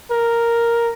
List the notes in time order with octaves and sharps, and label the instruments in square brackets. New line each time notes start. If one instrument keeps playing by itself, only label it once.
[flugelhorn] A#4